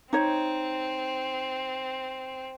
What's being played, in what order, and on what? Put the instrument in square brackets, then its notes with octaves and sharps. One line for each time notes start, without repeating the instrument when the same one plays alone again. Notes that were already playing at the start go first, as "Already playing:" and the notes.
[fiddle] C4 [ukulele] D#4 C#5